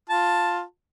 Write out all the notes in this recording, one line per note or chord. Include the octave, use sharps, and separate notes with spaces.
F4 A5